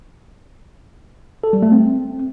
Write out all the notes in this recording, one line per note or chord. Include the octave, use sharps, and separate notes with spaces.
A4
G3
A3
C4